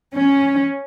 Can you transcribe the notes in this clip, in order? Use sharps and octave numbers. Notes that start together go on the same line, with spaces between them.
C#4